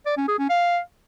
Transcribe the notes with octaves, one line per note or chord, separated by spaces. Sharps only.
D5
C#4
G#4
C#4
F5